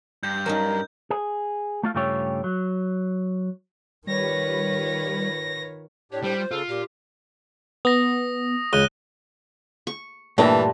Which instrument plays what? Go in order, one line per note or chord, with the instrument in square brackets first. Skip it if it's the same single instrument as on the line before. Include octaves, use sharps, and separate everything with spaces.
[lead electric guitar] G2 [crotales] G6
[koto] F#3 C#4 D#4 [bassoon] A#4
[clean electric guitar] G#4
A3 F4 F5
G2 C#3 A3 F4 G4 C#5
F#3
[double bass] D#3 [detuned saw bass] G3 [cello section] F4 B4 C#5 [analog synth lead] A#6
[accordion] A2 D4 G4 [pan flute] C#5
[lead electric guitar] G3 [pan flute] C5
[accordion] F4
[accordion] C#3 A4 [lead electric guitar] F4
[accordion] A#2 [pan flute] G4
[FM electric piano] B3 [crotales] D#6 A#6
[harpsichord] C#2 [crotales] F#6 D#7 G7
[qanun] C#6
[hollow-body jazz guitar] G2 A#2 G3 [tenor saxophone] E3 [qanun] A3 D4